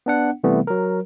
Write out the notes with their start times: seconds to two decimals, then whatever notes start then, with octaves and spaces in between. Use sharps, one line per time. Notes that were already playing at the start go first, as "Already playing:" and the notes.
0.06 B3 D4 F#5
0.44 C3 E3 G3 A3 B3
0.67 F#3 A#4